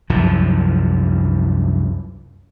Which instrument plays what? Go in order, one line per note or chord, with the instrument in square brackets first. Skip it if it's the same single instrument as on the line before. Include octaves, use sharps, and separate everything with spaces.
[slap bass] C2 F#2 E3 F3